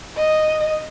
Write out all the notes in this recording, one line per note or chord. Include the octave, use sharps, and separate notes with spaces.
D#5